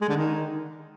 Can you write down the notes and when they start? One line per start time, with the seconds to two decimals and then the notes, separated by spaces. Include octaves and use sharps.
0.01 G#3
0.09 D3
0.17 D#3